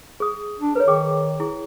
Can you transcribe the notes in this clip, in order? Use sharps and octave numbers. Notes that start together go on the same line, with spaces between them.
G#4 D#6
D4
A#4 B4 C#5
D#3 G#4 G5 D6
E4 G#4